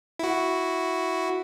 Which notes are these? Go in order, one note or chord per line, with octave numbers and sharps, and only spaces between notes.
E4 F#4